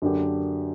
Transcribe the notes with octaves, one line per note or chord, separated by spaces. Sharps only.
F#2 D3 A#3 D4 G4